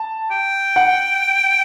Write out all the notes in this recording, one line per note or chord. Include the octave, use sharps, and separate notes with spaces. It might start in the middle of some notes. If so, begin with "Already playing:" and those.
Already playing: A5
G5
F#5